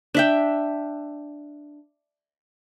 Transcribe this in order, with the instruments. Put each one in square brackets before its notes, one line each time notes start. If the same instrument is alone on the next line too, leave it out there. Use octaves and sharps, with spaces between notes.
[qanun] D4 E5 G5